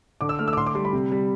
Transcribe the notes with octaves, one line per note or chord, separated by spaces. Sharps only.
D3 D6
E6
A3 F6
E6
D6
D3 C6
D6
G3 C6
B5
C3
G3